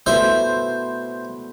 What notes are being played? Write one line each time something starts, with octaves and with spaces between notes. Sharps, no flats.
B2 A3 E4 B4 C5 D5 E5